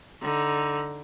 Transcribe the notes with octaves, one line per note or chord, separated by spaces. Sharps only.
D3 D#4